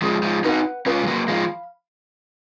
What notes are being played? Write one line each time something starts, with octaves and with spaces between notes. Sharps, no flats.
F3 G#3 G#4
F3 G#3
D#4 F#4 B4 F#5
C#4 F4 B4
G#3
F#3 A#3
F3 G#3 F5 B5